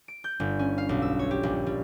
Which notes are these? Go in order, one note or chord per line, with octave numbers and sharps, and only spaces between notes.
D7
G6
G1
C#4
F5
B1
E6
C#5
G4
A#1
G3